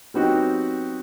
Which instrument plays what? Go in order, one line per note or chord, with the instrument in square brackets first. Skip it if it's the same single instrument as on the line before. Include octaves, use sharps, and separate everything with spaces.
[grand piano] F#3 B3 C4 D#4 F#4 G4